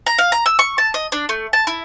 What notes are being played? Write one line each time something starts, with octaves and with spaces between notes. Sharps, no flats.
A#5
F5
A#5
E6
C#6
A5
D#5
D4
A3
A5
E4